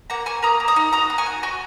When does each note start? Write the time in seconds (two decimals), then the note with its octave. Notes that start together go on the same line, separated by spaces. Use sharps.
0.10 A#3 F#5 A#5
0.26 A#3 G#5 C#6
0.43 A#3 A#5 D#6
0.60 A#3
0.68 A#5 D#6
0.76 D#4
0.93 F#4 A#5 D#6
1.10 A#3
1.18 G#5 C#6
1.26 F#4
1.43 F#4 G#5 C#6